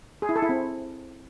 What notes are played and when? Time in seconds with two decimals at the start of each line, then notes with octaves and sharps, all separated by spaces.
0.22 G#4
0.29 E4
0.36 A4
0.42 E4
0.49 C4